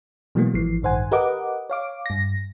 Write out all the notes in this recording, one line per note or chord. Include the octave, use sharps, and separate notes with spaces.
B2 E3 F#3 G#3 A#3 B3
G#1 E3 F3 C7
A1 G2 D#3 C5 F#5 G#5
G4 A#4 B4 D#5 F#5 D6
C#5 F5 D6
G2 A#6